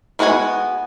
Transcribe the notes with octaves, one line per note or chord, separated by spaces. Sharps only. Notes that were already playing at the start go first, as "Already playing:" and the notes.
G#3 B3 F#4 F#5 G#5